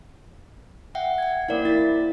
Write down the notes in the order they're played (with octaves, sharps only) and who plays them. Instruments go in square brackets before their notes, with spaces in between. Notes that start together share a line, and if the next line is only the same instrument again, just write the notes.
[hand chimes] E5 F#5 G5
G5 G#6
[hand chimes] A#3 A#4 F5 [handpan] E4 C5 D5
[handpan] E4 [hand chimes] A6 B6